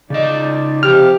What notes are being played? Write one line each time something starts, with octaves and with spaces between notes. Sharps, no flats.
C#3 D#4 D5 D#5
C3 F3 G4 F6